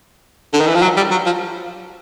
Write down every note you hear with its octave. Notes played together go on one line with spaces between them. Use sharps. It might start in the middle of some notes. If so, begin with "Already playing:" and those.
D3
D#3
E3
F3
F#3
G3
F#3
F3